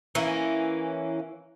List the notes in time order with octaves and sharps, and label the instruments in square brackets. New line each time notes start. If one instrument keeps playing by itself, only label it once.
[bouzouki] E3 A#3 C#4